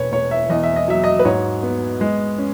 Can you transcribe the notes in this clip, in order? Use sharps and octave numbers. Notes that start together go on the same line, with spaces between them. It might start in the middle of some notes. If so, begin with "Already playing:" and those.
Already playing: E1 B4 C#5
E1 C#5
E5
E2 D#5
E5
D#5
F#3 E5
D#5
B4
G#2 C#5
B3
G#3
C#4